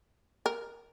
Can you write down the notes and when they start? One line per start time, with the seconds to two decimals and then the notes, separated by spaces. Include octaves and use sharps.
0.46 A#4